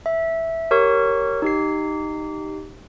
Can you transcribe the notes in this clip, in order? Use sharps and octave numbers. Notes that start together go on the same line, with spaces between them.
E5
G4 A#4 C#5 C#6
D#4 G4 C7